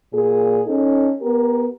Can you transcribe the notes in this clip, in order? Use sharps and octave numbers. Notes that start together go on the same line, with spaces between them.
A#2 G#4
C#4 D#4 A4
B3 G4 A#4